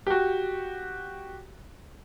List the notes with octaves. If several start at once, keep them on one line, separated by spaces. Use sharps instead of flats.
F#4 G4